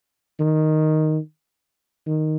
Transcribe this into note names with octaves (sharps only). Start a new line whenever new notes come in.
D#3
D#3